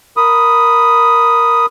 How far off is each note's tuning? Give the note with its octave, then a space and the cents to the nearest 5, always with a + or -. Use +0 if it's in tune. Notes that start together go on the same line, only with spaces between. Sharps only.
A#4 +0 B5 +0 D#6 +0